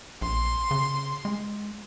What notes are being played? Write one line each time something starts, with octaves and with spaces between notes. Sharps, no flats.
A#1 C6
C#3
G#3